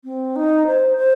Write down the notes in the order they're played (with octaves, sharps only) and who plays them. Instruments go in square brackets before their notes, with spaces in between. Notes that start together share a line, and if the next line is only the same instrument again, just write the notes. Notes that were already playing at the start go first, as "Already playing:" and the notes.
[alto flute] C4
D#4
C5
C5